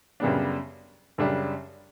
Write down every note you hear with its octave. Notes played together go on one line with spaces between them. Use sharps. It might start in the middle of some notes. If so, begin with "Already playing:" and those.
F#2 C#3 G3 B3 D4
F#2 C#3 G3 D4